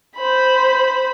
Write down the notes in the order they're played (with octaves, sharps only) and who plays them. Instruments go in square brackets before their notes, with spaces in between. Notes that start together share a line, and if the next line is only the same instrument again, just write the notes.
[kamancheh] C5 B5